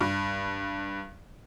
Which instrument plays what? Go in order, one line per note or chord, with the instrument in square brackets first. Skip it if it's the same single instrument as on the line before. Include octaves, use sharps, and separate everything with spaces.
[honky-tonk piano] G2